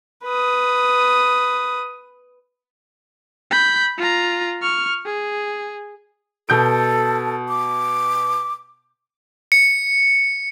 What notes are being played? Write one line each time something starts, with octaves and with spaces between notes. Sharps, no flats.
B4 D#6
B5 G6
F4 A#5
C#6 F6
G#4
B2 A4 G6 D7
D6
C#7